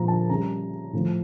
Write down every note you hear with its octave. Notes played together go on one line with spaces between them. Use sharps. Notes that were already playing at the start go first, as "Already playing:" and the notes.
Already playing: A#2 F3 A#5
A5
C#3 G3 A#5
A2 F3